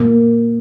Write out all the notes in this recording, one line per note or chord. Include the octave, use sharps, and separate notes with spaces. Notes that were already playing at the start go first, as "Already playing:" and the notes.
Already playing: A#3